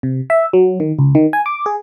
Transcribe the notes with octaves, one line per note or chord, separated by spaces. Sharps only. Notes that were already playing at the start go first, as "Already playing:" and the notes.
C3
E5
F#3
D#3
C#2
D#3
G#5
D6
G#4